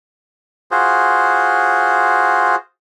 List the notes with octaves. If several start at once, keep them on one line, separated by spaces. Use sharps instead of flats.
F4 F#4 G#4 C5